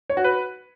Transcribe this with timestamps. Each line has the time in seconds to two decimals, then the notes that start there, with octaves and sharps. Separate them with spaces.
0.10 C#5
0.17 F#4
0.24 B4